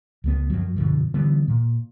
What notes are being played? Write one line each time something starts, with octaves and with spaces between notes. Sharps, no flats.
C#2 F#3 B3
F#2 F3 F#3
F#2 B2 D3 F3
D3 E3 G3 B3
A#2